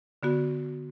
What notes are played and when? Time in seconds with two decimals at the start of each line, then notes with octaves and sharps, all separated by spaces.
0.23 D3 B3 F#4